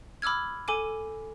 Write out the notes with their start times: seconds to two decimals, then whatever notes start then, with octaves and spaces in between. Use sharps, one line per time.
0.22 B5 D6 E6 F6 G#6
0.68 A4 G#5 D6 D#7